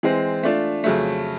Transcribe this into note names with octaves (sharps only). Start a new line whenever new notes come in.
E3 G#3 C4
A3 D4 F4
F2 C#3 F#3 A3